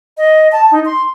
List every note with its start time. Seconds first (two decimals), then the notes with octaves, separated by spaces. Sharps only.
0.17 D#5
0.52 A5
0.71 D#4
0.85 C6